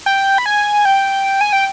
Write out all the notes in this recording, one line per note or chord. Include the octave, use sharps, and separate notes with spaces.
G5
B5
G#5
G5
G#5
G5